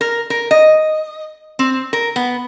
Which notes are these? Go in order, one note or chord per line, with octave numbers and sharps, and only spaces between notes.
A#4
A#4
D#5
C4
A#4
B3